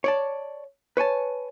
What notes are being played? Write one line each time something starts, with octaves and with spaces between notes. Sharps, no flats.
C#5 D5 A5
B4 C#5 G#5 A5